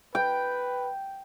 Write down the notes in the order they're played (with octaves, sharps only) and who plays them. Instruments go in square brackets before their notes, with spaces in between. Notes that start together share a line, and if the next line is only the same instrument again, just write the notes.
[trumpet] B4 [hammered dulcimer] G5